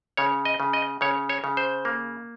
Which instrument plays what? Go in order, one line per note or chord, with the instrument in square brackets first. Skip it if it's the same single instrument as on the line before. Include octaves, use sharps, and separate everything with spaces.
[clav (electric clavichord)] C#3 C#5
D#5
C#3
D#5
C#3 C#5
C#5
C#3
C5
A#3